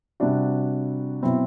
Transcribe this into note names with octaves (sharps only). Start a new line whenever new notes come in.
C3 G3 D4 F#4
B2 F#3 C4 E4